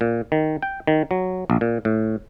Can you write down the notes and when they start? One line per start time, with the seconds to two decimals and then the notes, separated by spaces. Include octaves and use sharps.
0.01 A#2
0.32 D#3
0.62 G5
0.87 D#3
1.11 F#3
1.50 A#1
1.61 A#2
1.85 A2